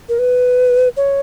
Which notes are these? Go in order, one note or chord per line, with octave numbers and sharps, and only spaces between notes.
A#4
B4
C#5